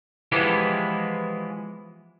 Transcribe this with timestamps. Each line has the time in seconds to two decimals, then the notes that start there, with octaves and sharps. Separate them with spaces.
0.32 E3 F3 G#3 B3 E4 G4